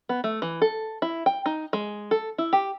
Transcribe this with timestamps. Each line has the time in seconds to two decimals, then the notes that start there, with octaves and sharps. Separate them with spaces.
0.09 B3
0.24 A3
0.42 E3
0.62 A4
1.02 E4
1.26 G5
1.46 D#4
1.73 G#3
2.11 A4
2.38 E4
2.53 G4